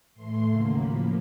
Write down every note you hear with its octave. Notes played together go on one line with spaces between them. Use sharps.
A2 E3 A3 C6
D#2 C#3 F#3 A#3
A2 F3 A#3 B5